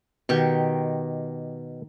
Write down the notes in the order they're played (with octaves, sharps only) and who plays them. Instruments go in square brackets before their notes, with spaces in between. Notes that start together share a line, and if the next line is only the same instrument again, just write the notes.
[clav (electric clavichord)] B2 [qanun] D#3 G4 C#6